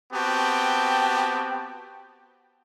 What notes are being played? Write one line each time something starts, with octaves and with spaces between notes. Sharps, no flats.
B3 C4 F#4 G4 G5 A5